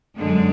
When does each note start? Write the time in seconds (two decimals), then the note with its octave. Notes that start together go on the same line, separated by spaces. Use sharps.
0.16 F#2 D3 G#3